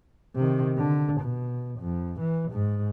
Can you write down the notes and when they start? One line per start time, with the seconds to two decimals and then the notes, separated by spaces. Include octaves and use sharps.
0.36 C3 D#3
0.78 D3
1.21 B2
1.80 F2
2.20 E3
2.51 G#2